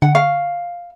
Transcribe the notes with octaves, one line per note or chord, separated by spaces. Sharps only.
D3 F#5
F5 C#6